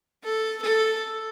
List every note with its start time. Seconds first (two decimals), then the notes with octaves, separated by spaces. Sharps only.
0.24 A4
0.62 A4